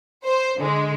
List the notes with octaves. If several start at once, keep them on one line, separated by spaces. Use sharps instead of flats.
C5
D3 G#3